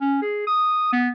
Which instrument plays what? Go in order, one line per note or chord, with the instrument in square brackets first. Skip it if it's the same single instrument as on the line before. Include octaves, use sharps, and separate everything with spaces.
[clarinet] C#4
G#4
D#6
B3